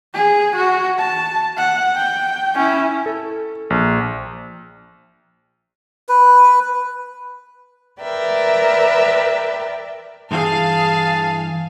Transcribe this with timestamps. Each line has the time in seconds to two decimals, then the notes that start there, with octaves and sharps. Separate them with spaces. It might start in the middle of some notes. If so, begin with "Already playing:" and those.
0.14 G#4
0.56 F#4
0.98 A5
1.58 F#5
1.96 G5
2.55 C#4 E4
3.06 A4
3.70 A#1
6.09 B4
8.01 A#4 B4 D5 E5 G5
10.31 G2 E3 G#4 F5 A5